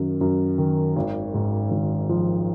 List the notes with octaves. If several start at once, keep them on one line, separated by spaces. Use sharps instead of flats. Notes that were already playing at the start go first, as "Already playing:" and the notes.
Already playing: F#2 D#3
F#2
D#3
G#1
G#2
G#1
F3